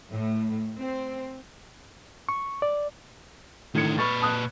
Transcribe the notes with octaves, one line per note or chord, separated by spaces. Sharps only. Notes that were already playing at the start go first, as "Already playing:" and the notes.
A2
C4
C#6
D5
A2 D3 D#3 G#6 C#7
A#2 B4 C#6 F6 A6
A5 D#6 F#6